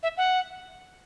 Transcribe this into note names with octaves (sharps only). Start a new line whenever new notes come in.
E5
F#5